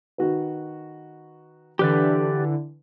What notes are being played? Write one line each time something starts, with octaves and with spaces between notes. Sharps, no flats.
D#3 F#4 B4
D3 E3 D4 G4 B4 D5